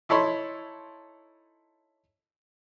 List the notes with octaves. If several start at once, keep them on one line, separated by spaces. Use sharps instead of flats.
D#4 E4 A4 C#5 B5 C6